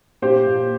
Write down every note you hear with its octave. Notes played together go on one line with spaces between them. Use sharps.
A#2 G4 C5
A#2